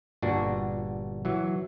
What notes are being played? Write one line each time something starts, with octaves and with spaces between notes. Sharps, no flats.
G1 A#2 D4 F#4
E3 F#3